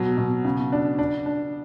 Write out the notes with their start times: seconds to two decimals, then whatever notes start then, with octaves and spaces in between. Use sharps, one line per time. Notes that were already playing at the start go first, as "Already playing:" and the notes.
Already playing: B2 F#3
0.18 B2
0.45 C#3
0.72 D4
0.98 D4
1.26 D4